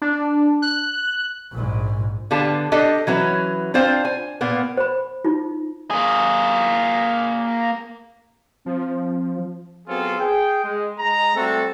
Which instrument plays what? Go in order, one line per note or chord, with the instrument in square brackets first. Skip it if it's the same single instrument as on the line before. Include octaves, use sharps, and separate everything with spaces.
[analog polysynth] D4
F#6
[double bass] A#1 G#2
[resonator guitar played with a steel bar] D3 B3 G4 F5 A5
D4 G4 A4 D#5
E3 F#3 C#4 B4
C4 D4 F4 C5 F5
G#5
A#2 A#3 B3
[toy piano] C5 B5
D#4 F4
[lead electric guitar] A#3 G#4
[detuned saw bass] F3 [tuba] C4
[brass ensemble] F#3 B3 C4 F4 G#4 A4
G#4 G5
G#3
G#3 A#5
G3 A3 C4 F#4 A4